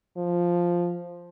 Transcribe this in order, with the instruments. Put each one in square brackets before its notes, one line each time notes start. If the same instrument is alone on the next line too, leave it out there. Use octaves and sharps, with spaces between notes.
[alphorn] F3